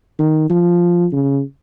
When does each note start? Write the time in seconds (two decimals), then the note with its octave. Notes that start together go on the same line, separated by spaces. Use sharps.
0.19 D#3
0.50 F3
1.12 C#3